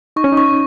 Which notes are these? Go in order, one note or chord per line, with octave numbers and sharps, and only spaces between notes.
D#4 C#6
C#4
D#4
C#6